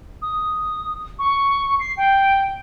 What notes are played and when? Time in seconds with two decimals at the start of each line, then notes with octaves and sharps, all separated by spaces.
0.22 D#6
1.19 C#6
1.80 C7
1.97 G5